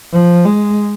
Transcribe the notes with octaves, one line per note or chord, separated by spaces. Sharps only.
F3
G#3